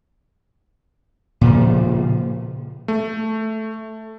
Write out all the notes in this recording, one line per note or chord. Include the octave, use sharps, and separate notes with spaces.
A#2 C#3 F3
A3